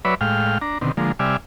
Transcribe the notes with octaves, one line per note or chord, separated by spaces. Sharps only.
F#3 B4 C#5 D5 E5 B5
A2 G#3 F5 G5 F6
D4 A#5
B2 D3 D#3 C4
D3 F3 G#3 A#3
C3 G3 D5 E5 G#5 F6